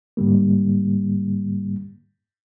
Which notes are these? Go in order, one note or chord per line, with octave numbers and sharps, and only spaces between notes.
G#2 D3 G3 A#3